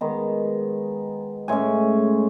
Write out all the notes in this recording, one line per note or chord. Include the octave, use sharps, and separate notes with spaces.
D#3 G#3 B3
A2 G#3 C#4 G#5